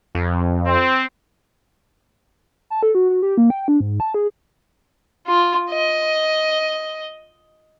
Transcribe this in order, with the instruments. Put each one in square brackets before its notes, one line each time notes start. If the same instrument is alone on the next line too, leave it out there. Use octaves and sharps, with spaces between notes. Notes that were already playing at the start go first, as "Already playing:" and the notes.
[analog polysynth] F2
[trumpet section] C4
[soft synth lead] A5
A4
F#4
F#4
G4
A#3
G5
D4
G#2
A5
G#4
[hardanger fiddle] F4
D#5